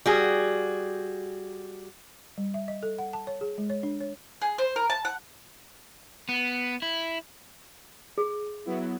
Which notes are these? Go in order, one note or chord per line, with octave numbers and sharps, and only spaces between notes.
G3 F#4 G#4
G3
E5
D#5
A4
F#5
A5
C#5
G#4
G#3
C#5
D4
C#5
G#4
C5
A#4
A5
F#5
B3
E4
G#4
F#3 B3 E4